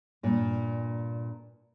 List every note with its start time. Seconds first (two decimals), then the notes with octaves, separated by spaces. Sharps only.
0.23 G2 A#2